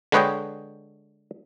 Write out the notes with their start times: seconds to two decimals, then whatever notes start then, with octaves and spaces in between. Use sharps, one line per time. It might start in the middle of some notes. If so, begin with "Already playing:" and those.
0.12 D3 G#3 B4 C#5 D#5 G5